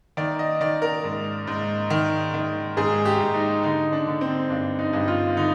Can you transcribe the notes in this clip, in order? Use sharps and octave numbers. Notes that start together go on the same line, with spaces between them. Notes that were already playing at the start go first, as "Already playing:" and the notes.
D#3 D5
D#5
D#3 D5
A#4
G#2
G#2
D#3
D#3
G#2 G#4
G4
G#2
D#4
D3 D#4
D4
D3
C4
G2 D4
D#4
G2
F4
D3 D#4